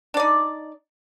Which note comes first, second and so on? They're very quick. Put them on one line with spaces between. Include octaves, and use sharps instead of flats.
D4 D5 D#4